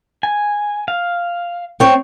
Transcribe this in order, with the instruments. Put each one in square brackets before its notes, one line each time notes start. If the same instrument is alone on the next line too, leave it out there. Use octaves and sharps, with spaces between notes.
[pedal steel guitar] G#5
F5
[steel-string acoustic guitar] C4 C#5